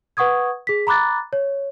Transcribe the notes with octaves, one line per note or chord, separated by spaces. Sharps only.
B4 F#5 C#6 D#6 G#6
G#4 B6
A#5 B5 D6 F#6 A6
C#5